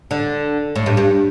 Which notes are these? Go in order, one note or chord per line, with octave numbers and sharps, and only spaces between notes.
D3
A2
G2
G2